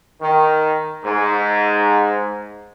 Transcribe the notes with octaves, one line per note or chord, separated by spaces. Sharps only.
D#3
G#2